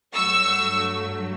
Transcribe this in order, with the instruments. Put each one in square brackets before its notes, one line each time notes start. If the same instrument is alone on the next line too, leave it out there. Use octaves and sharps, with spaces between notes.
[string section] G2 F#3 A3 C#6 E6